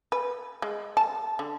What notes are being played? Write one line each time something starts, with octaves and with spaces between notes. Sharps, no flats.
B4
G#3
A5
D3